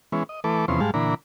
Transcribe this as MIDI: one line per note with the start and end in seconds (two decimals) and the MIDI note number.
0.12 0.23 52
0.12 0.23 56
0.12 0.23 59
0.12 0.23 61
0.29 0.40 75
0.44 0.66 52
0.44 0.66 57
0.44 0.66 69
0.44 0.66 71
0.44 0.66 86
0.68 0.80 40
0.68 0.80 48
0.68 0.80 53
0.68 0.80 59
0.68 0.80 61
0.68 0.80 84
0.80 0.91 44
0.80 0.91 55
0.80 0.91 56
0.80 0.91 77
0.80 0.91 81
0.94 1.14 46
0.94 1.14 50
0.94 1.14 52
0.94 1.14 62
0.94 1.14 82
0.94 1.14 83